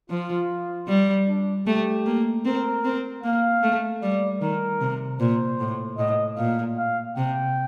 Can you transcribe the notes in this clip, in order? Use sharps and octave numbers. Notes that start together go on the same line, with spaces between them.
F3 F4
G3
D4
A3 G4
A#3
C4 A#4
C4
A#3 F5
A3
G3 D5
D#3 A#4
C3
A#2 C5
A2
A2 D#5
A#2 F5
F5
C3 G5